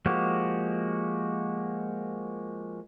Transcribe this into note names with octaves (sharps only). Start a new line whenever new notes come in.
F3 G#3 A#3 F#4 G4